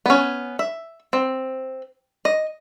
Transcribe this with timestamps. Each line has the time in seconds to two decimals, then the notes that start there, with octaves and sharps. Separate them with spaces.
0.06 B3 C#4
0.59 E5
1.13 C4
2.25 D#5